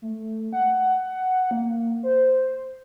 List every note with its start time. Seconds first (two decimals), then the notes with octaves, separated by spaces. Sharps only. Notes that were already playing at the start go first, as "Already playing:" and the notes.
0.02 A3
0.53 F#5
1.51 A#3
2.03 C5